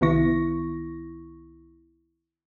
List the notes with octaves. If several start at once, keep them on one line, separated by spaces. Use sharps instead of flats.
C2 D#3 B3 E4 C#6 A#6